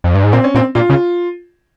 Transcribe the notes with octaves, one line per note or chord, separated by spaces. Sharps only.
F2
G2
G#2
A#2 C4
C#4
A#2 C4
A#2 F4
C#3